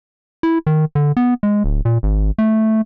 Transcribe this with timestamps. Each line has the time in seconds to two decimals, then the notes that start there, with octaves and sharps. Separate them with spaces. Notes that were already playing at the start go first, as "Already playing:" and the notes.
0.43 E4
0.67 D#3
0.95 D3
1.17 B3
1.43 G#3
1.64 D1
1.85 A#2
2.03 G#1
2.38 A3